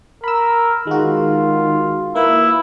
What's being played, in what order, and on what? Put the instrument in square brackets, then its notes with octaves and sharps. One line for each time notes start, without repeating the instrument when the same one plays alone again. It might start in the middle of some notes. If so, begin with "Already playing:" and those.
[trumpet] A#4 [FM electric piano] B5 E6
[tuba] D#3 [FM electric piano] G#3 F#4 [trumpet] F4
[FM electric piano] A#3 B4 [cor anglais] E4